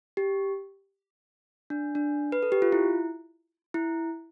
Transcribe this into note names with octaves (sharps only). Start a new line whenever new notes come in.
G4
D4
D4
B4
A4
G4
F4
E4
E4